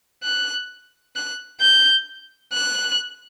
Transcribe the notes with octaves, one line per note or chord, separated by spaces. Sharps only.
F#6
F#6
G6
F#6